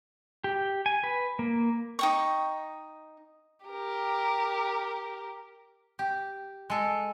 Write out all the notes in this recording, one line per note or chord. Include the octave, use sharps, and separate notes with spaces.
G4
G#5
B4
A#3
D#4 G5 C#6
G4 A#4
G4
G#3 A4